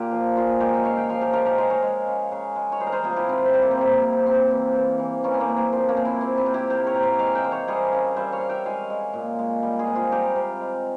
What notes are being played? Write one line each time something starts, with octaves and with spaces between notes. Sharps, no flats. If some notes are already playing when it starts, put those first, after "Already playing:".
Already playing: A#2 F4 G4 A#4
F3
A#2 F4 G#4
G#3 G4 A#4
E5
C#3 C#5 F5
E5 G5
F3 F5 G#5
G4 A#4
G#3 G4 A#4
G4 A#4
G#3 G#4 C5
A#4 C#5
G#3
C#3
C#3
G#3
C#5
G3 G#4 C5
A#4
G#4 C5
C3 F4 G#4
E4 G4
C3 C4 E4
C4
G3
A#3
C4
C3 A#3
C3
C3 C4
E3
E3
E3
G3 A#3 C#4
C4
A#3
C3
A#3
F3 C4
A#3 C#4
C3
C4 E4
C3 C4
C4 E4
C3
E4 G4
C3 G4 A#4
A#4 C#5
C3
C5 E5
G#3 C#5 F5
E5 G5
G#3 C5
A#4 C#5
G3 G#4 C5
C#3
G3 C5 E5
C#5 F5
G3
E5 G5
G#3 F5 G#5
G#3
A#2
G#3
G3
F4 G#4
C3
F4 G#4
G3 G4 A#4
C3
G#3